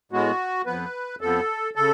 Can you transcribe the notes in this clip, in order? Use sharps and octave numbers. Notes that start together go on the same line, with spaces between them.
A2 G#3 B3 F#4
F2 F3 B3 B4
F2 F3 B3 A4
C#3 A4